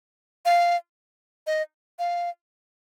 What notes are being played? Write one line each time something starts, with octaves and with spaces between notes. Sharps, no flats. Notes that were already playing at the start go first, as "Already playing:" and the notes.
F5
D#5
F5